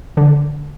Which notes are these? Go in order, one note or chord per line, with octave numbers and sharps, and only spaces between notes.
D3